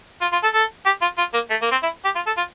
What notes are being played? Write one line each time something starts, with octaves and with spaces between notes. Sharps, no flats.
F4
F4
A4
A4
G4
F4
F4
A#3
A3
A#3
C4
E4
G4
F4
A4
F4